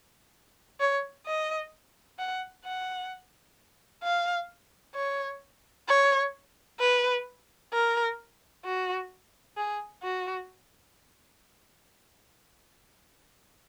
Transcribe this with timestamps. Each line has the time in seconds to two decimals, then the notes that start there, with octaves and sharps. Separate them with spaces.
0.80 C#5
1.26 D#5
2.19 F#5
2.65 F#5
4.04 F5
4.96 C#5
5.88 C#5
6.80 B4
7.73 A#4
8.65 F#4
9.57 G#4
10.03 F#4